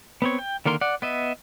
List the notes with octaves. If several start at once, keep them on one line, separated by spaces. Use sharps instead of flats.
B3 C4 C#5
G5
D3 D#3 A#3 A#4 C6
D5 F#5
B3 D#5 E5